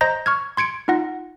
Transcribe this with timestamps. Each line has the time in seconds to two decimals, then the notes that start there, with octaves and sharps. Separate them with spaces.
0.01 C5 D#5 A#5 G6 A#6
0.26 C#6 F6 G#6
0.57 C6 G#6 C#7 D7
0.88 D#4 F4 F#5 A#6